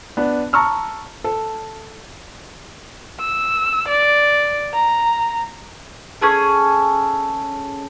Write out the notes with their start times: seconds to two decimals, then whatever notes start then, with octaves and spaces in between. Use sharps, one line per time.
0.17 B3 D4
0.53 A5 A#5 C#6 E6 F6
1.24 A4
3.20 E6
3.88 D5
4.74 A#5
6.21 C#4 G#4 A4